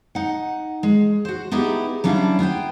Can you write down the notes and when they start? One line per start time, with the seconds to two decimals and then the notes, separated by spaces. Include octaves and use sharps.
0.15 D#4 F#5
0.83 G#3
1.25 F#4 C5
1.52 B3 D#4 E4 G4 G#4
2.04 F#3 G3 C#4 D4 E4 F5
2.39 B3 E4 C5 G5